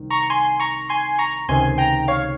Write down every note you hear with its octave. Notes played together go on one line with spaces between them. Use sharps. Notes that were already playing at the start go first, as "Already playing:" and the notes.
Already playing: C2 D#3
A#5 C#6
G#5 C6
A#5 C#6
G#5 C6
A#5 C#6
C#2 C3 D#3 G#5 C6
G5 A#5
C#5 F5